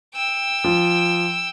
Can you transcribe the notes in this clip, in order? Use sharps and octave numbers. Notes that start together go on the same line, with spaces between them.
G5 E6
F3